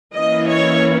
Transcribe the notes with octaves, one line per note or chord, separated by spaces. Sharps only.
E3 A#3 C#4 E4 D#5
C#5